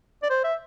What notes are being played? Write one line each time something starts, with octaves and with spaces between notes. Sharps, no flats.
D5
C5
E5